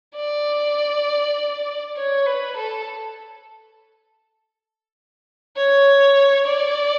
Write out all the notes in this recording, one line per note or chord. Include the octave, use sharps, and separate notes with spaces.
D5
C#5
B4
A4
C#5
D5